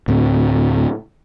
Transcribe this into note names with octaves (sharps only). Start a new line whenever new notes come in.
D2 A2 C4